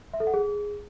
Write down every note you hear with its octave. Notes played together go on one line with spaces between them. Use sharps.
E5
A4
F#5
G#4